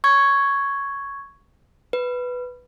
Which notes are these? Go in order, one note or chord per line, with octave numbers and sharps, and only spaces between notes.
C#6 G#6
B4